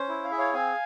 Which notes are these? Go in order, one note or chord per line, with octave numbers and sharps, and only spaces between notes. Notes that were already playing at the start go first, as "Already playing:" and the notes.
Already playing: C#4 C5
E4
F5
G#4 E5
C#5 F5
C4 F5 G#5